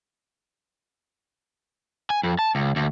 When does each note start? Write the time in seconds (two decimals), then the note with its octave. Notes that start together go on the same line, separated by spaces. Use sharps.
2.10 G#5
2.23 F2
2.39 A5
2.55 C#2
2.76 D2